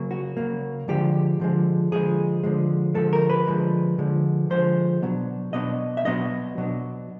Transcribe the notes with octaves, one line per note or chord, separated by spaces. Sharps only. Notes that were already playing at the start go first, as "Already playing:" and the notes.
Already playing: C#3 F#3 A#3
F#4
C#3 F#3 A#3
D3 F3 G#3 G4
D3 F3 G#3
D3 F3 G#3 G#4
D3 F3 G#3
D3 F3 G#3 A4
A#4
B4
D3 F3 G#3
D3 F3 G#3
D3 F3 G#3 C5
B2 F#3 B3 D4
B2 F#3 B3 D4 D#5
E5
B2 F#3 B3 D4 D#5
B2 F#3 B3 D4